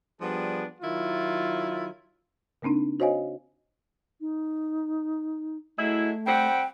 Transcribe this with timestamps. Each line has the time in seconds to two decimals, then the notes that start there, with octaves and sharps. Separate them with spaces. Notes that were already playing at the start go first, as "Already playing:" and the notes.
0.21 F3 G3 B3 D4 G#4
0.81 D#3 F#3 E4 F4
2.62 C#3 A#3 C4 D4 D#4
3.00 F#4 C5 C#5 D#5 F5 G#5
4.21 D#4
5.78 F#3 G#3 A3 E4
6.27 G3 C4 F#5 G5